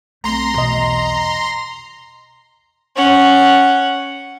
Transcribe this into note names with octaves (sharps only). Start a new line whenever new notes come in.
B1 A3 C4 A#5 C6
E2 B2 D#5
C#4 F#5